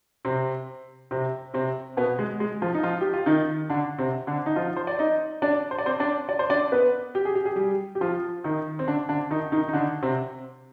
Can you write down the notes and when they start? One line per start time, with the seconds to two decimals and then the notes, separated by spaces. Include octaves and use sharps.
0.25 C3 C4
1.11 C3 C4
1.54 C3 C4
1.97 B2 B3
2.19 G#3
2.40 G#3
2.62 F3 F4
2.74 D#4
2.83 F3 F4
3.01 G4
3.13 F4
3.26 D#3 D#4
3.70 D3 D4
3.98 C3 C4
4.27 D3 D4
4.46 D#4
4.56 F3 F4
4.76 C5
4.87 D5
4.99 D#4 D#5
5.42 D4 D5
5.71 C5
5.78 D5
5.86 C4 C5
6.00 D4 D5
6.29 D5
6.39 C5
6.50 D4 D5
6.72 B3 B4
7.15 G4
7.25 G#4
7.35 G4
7.45 G#4
7.56 G3 G4
7.95 G4
8.01 F3 F4
8.44 D#3 D#4
8.79 C4
8.87 D3 D4
9.09 D3 D4
9.31 D#3 D#4
9.52 D#3 D#4
9.68 D#4
9.73 D3 D4
10.02 C3 C4